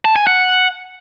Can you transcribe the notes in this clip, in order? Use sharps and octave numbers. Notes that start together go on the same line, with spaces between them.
A5
G#5
F#5